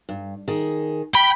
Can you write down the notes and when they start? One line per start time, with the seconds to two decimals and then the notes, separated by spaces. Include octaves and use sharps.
0.09 G2
0.48 D#3 G#4
1.15 G5 B5